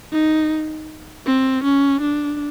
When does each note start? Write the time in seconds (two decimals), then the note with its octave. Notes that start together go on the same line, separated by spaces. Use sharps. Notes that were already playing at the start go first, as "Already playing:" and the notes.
0.13 D#4
1.26 C4
1.64 C#4
2.01 D4